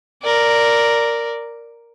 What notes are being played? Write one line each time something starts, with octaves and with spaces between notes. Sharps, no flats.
A#4 D5